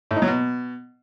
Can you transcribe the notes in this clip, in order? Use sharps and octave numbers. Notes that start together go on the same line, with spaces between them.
A2
D#4
F#3
B2